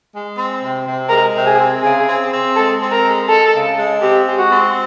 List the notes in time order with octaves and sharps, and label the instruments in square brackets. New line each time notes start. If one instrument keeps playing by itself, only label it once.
[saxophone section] G#3
C4
C3
C3
[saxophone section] G#3 [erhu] A#4
[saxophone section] C3
[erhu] G#4
[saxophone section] C4
[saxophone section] C#3 [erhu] G#4
[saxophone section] C4
C4
[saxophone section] G#3 [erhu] A4
[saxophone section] C4
[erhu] A#4
[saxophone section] G#3
[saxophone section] G#3 [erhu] A4
[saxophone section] C#3
G#3
[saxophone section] C4 [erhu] G4
[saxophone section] G#3
[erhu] F#4
[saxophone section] C4